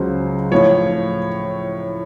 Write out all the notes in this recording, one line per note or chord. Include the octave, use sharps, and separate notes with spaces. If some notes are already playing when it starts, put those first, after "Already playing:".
Already playing: C#2 C#3 F#3 C5
A2 F3 C#5